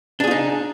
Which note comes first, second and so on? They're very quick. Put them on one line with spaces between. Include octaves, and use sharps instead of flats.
D4 G#4 F4 D#4